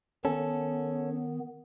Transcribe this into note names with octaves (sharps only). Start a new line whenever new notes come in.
D#3 B3 C#4 A4